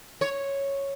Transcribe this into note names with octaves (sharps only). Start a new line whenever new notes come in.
C#5